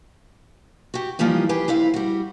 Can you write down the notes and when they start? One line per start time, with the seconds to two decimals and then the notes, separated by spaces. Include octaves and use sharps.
0.94 F#4 G4
1.19 E3 F3 G3 A#3 D#4
1.49 G4 G#4 B4
1.68 F2 E4 B4 F5
1.94 G3 F#4